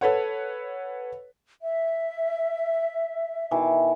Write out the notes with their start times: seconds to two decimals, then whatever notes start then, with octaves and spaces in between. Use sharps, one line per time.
0.01 A4 B4 C#5 F#5
1.61 E5
3.51 B2 D#3 E3